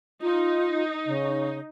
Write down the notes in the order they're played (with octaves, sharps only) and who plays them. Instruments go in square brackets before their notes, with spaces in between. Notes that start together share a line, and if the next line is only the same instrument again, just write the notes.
[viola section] D#4 [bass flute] F4
[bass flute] C#3